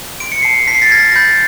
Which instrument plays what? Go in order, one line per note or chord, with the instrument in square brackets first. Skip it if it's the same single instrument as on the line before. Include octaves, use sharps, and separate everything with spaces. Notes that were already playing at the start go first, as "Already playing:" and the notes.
[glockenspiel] C6 D7
C#7
A5 C7 D7
A5 B6
C7
A6 B6
F6 G#6 A#6
A#6
B5 G6 A6